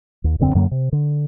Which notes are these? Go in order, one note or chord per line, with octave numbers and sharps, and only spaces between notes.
D#2
D#1 F#2 D3 C4
F#2 D3 F#3 A#3
C3
D3